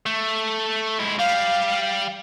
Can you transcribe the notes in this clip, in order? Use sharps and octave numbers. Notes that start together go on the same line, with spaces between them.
A3
G#2 E4
G3 F5